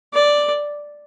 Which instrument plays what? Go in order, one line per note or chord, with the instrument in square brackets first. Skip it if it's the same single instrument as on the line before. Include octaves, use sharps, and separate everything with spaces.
[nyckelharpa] D5